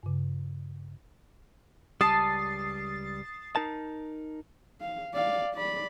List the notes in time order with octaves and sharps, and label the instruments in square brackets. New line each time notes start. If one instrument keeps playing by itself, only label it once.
[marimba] G2 C#3
[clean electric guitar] C#2 G3 [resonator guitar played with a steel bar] A5 [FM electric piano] D#6 A6 C7
[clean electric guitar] D#4 A#4 A5
[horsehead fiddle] F5
D5 F5
D5 B5